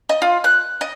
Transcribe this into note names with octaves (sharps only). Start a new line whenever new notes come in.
D#5
F4
F#6
D#5